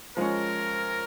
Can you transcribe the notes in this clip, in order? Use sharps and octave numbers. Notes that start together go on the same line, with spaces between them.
F3 G#3 C#4 A#4